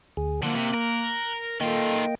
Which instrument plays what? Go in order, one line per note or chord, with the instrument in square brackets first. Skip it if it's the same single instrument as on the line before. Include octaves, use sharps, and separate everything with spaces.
[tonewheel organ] D2 G#4
[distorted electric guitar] D3 F3 [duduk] A#3 [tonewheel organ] F#6
[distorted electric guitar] C3
A#4
[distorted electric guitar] D#3 F4 [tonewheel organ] A#3 D#5 G5 [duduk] A4